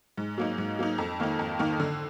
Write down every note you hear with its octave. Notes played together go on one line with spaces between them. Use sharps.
G#2
F#3 A#3 D#4
G#2
F#3 A#3 D#4
F2
D#3 A#3 D#4
F2
D#3 A#3 D#4
D3